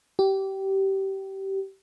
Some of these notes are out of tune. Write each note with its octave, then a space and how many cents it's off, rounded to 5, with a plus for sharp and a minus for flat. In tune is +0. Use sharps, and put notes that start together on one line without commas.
G4 -20